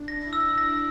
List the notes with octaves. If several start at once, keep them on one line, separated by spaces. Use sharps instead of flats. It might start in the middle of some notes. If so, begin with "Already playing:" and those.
Already playing: D4
A#6
E4
E6
A#6